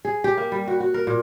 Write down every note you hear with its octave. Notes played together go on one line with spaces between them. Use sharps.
G#4
G4
A#3
G3
F#4
F#4
A#4
A#2